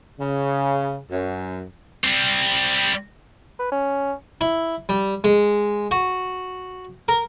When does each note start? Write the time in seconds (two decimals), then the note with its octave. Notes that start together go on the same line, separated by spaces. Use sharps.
0.20 C#3
1.11 F#2
2.04 G3 C4
3.59 B4
3.72 C#4
4.41 E4
4.89 G3
5.24 G#3
5.91 F#4
7.08 A#4